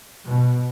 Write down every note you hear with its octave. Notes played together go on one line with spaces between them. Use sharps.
B2